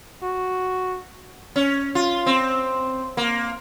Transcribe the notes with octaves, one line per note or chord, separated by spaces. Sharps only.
F#4
C#4
F4
C4
A#3